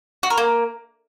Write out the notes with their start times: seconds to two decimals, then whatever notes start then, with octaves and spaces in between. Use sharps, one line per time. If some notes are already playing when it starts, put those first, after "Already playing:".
0.23 F#4
0.30 A#4
0.38 A#3